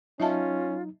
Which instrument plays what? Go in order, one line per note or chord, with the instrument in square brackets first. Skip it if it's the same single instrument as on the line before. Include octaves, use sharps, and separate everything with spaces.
[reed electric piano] F#3 D#4 [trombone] C#4 [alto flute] F4 [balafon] D#5 E5 A5